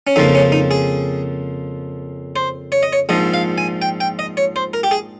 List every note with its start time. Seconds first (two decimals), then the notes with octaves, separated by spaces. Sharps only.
0.07 C#4
0.16 F2 C#3 F3 A#3 D#4
0.35 C#4
0.52 D#4
0.71 G#4
2.36 C5
2.72 C#5
2.83 D#5
2.93 C#5
3.09 A#1 G#2 F3 D#5
3.34 F5
3.58 G#5
3.82 G5
4.00 G5
4.19 D#5
4.37 C#5
4.56 C5
4.73 A#4
4.83 G4
4.91 G#4